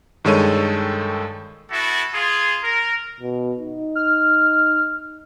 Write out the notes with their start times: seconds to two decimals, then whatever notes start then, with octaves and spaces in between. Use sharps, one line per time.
0.24 G2 D#3 G#3 A4 C#5 D#7
1.71 B3 E4 F#4 A4
2.13 F4 G#4
2.63 A#4
3.21 B2
3.60 D#4
3.95 F6